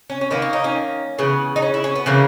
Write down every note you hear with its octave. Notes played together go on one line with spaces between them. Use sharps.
C#4
C#4
D#3 A#3 B3
C#4
D#4
C#4
C#3 E3 B3
D#4
C#4
E4
C#4
B3
C#3 E3 A#3 C#4